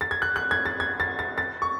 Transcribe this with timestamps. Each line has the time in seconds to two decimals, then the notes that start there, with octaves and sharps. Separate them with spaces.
0.01 A6
0.11 G#6
0.22 F#6
0.36 F#6
0.51 G#6
0.65 A6
0.80 G#6
1.00 A6
1.19 A6
1.38 A6
1.62 C#6